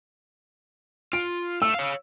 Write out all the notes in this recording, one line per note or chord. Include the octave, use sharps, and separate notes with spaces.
F4 D7
A3 E6
C#5 F5